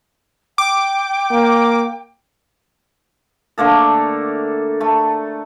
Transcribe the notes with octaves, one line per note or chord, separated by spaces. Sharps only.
G5 D6
A#3
D3 A3 A#3 A4
A3